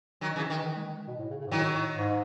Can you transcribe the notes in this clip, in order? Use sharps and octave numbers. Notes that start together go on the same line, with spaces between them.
D#3 F#3
C#3 E3
D#3
E3
D#3
G#3
D#3
B2
A2
C#3
C#3
G#2
A2 D#3 F#3
A2
G#2